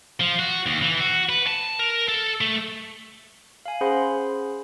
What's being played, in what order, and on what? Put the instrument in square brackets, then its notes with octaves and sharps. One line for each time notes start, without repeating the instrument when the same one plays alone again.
[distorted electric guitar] F3
F#4
D#2
E3
F#4
B4
A5
A#4
A4
A3
[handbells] F5 G#5
C#4 G#4 C5 F#5 B5 C6